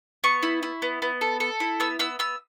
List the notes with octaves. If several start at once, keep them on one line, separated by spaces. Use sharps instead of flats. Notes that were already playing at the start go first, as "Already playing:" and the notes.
B3 C#6
E4
E4
B3
B3
A4
A4
E4
B3 E6
B3 E6
B3 E6